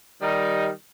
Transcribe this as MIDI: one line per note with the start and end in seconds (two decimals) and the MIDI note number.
0.22 0.69 51
0.22 0.69 55
0.22 0.69 63